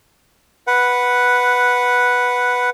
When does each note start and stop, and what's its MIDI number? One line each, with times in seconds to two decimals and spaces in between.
0.67 2.70 71
0.67 2.70 78